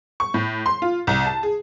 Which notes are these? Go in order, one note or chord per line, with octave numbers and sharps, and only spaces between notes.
C#6
A2
C6
F4
C2
A5
G#4